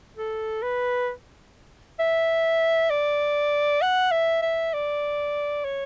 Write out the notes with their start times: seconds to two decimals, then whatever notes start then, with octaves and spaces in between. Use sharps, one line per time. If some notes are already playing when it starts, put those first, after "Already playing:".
0.17 A4
0.63 B4
2.00 E5
2.90 D5
3.82 F#5
4.12 E5
4.42 E5
4.73 D5
5.64 C#5